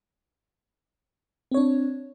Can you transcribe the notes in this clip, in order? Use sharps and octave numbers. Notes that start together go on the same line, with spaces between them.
C4 D4 C#5